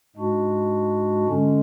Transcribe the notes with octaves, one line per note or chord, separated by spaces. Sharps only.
G#2 G#3 D4 F#4
D3 G#3 C#4